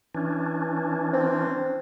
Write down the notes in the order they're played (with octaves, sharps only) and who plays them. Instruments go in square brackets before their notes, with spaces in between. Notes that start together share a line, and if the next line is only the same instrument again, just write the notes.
[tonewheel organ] E3 C#4 D4
[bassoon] C4